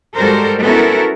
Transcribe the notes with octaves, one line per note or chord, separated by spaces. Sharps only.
G#2 G3 F#4 A4 A#4 C5
B3 C#4 E4 F#4 A4 A#4